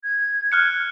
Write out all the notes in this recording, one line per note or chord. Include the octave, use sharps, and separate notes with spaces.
G#6
F6 F#6 C#7